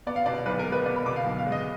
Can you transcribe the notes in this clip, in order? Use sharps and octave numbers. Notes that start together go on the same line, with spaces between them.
B3 D5
F5
B2 D5
B1 B4
A#4
G#3
B4
B3 D5
B5
B2 D6
F5
B1
F5
G#3
D#5